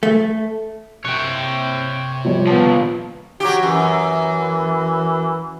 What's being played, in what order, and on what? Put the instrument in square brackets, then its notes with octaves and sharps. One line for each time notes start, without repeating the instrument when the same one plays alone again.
[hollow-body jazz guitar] A3
[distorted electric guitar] C3 [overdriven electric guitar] C#5 G5 [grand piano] F#6
[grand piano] F3 G3 C#5
[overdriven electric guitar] A#2 F3 [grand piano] B3 A5
[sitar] F#3 G4 [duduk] F#4
[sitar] F#2 [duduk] E3